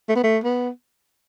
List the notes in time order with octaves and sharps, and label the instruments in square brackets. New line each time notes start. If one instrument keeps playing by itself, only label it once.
[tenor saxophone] A3
B3
A3
B3